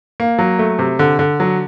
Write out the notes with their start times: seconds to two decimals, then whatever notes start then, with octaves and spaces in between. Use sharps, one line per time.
0.20 A#3
0.39 F#3
0.59 A3
0.79 C3
0.99 D3
1.19 D3
1.40 F#3